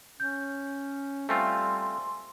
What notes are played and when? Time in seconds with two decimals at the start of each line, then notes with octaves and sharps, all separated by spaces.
0.20 C#4 G6
1.29 G3 A3 C4 F4 G#5 C6